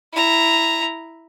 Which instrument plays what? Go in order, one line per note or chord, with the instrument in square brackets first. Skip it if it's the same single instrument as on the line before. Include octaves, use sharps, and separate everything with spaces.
[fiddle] E4 A#5